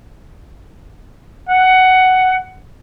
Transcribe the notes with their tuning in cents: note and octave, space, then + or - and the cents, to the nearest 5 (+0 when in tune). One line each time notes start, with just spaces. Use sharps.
F#5 +10